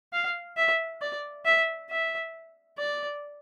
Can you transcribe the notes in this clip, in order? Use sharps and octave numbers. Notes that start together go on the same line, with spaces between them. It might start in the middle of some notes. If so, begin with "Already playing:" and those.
F5
E5
D5
E5
E5
D5